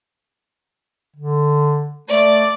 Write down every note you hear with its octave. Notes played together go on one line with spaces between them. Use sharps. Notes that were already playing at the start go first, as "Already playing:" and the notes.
D3
A3 D5